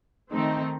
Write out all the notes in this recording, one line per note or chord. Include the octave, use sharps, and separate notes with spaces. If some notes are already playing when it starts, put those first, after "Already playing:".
D#3 A3 C4 D#4